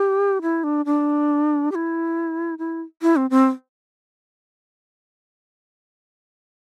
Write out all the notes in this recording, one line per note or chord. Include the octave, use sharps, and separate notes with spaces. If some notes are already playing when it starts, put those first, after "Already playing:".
Already playing: G4
E4
D4
D4
G4
E4
E4
E4
C4
C4